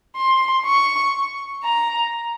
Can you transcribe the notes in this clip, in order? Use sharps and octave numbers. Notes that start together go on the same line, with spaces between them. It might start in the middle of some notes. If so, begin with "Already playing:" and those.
C6
C#6
A#5